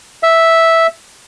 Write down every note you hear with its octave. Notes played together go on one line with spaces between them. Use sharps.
E5